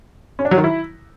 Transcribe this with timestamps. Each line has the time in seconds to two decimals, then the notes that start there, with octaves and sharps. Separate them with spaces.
0.39 C#4
0.45 D4
0.51 F#3
0.58 D#3
0.64 E4